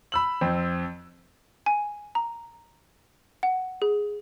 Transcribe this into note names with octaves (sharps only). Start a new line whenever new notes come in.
B5 E6 F#7
F2 C4
G#5
A#5
F#5
G#4